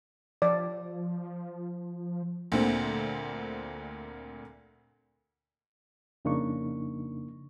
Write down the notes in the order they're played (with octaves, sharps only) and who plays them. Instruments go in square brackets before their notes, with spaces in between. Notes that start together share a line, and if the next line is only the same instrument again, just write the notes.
[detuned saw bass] F3 [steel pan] D5
[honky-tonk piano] D2 A#2 D3 C4
[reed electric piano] F2 C#3 A#3 D4 D#4 C#6